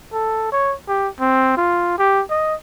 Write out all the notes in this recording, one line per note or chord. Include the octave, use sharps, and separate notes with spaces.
A4
C#5
G4
C4
F4
G4
D#5